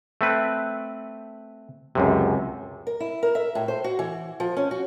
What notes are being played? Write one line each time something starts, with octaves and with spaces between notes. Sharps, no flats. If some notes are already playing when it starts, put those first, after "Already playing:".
A3 C4 B4
C#2 F#2 C3
A#4
E4
A#4
E5
A2
C5
F#4
E3
F3
C#4
F#4